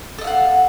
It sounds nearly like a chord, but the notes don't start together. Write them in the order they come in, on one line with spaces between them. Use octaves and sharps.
A4 D#5 F5 F#5